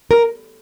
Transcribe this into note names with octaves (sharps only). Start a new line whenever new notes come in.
A#4